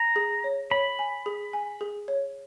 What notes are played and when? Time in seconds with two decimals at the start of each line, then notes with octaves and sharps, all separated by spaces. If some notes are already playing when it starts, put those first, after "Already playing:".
Already playing: A#5
0.16 G#4
0.44 C#5
0.71 C#5 B5
0.99 G#5
1.26 G#4
1.53 G#5
1.81 G#4
2.08 C#5